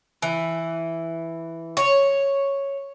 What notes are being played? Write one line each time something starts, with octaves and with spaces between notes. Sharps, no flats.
E3
C#5